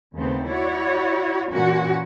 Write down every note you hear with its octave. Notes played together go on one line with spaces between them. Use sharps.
D#2 C#3 A3 B3 C4
E4 F#4 C#5 D5
A#2 E3 C#4 F#4